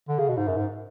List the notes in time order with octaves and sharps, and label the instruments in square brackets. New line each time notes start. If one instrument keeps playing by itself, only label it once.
[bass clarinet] D3
C#3
B2
G#2
F#2
G#2